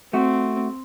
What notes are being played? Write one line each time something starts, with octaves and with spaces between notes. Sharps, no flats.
A3 C4 F#4